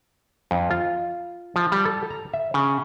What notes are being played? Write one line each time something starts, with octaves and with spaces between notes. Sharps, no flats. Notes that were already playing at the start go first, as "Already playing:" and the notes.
F2
F4
F3
G3
A4
A#5
E5
C#3